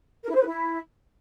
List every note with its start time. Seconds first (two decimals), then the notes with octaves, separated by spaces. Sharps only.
0.24 A#4
0.29 E4
0.35 C5
0.40 B4
0.46 E4